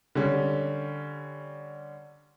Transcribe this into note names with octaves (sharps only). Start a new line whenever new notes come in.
D3 G3 C#4